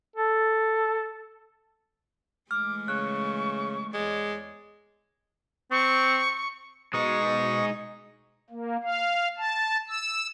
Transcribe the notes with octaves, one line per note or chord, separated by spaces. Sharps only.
A4
E3 G#3 A3 D6 F6
C#3 C#6 F#6
E2 G#3 C#5 D5
C4 C#6
B2 G#3 D#4 D#5 C#6 D#6
A#3
F5
A5
E6